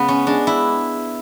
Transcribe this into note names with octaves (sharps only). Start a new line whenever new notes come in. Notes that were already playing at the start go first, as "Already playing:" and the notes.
Already playing: C#3 G#3 B3
C#4
G#3 D4
E4